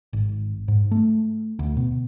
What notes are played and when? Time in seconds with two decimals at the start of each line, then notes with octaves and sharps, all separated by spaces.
0.13 G#1
0.68 G#2
0.91 A3
1.59 D2
1.77 B2